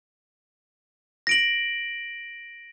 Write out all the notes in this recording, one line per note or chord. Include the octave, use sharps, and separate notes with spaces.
A#6 D7 F#7